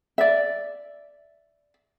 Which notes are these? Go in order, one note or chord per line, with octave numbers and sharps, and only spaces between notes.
D5 E5